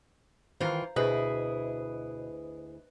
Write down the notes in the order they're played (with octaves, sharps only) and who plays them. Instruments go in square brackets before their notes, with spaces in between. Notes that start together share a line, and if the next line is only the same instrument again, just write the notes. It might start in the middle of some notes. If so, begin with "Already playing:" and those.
[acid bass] D#3 [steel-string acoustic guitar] E3 F4 [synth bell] C5 F5 A#5
[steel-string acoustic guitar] D2 E4 G#4 [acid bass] B2 [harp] B4 [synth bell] C5 D#5 D#6